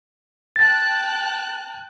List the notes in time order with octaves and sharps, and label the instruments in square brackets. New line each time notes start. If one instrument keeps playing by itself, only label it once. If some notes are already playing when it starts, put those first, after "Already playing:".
[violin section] G5 A5 F#6 [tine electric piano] A6